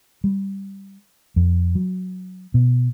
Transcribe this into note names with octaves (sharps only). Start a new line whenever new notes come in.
G3
F2
F#3
B2